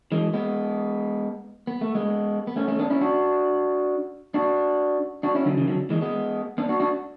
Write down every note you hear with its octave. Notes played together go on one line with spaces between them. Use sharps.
E3 G#3
G#3 B3
B3
A3
G#3 B3
B3
A3 C#4
A3 C#4
B3 D4
C#4 E4
D4 F#4
D4 F#4
D4 F#4
C#4 E4
D3 F#3
C#3 E3
D3 F#3
E3 G#3
G#3 B3
B3 D4
D4 F#4
D4 F#4